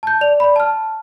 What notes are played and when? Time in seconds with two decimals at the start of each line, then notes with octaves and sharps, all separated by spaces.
0.03 A5 G6
0.21 D5 F7
0.40 D5 B5
0.56 A5 F6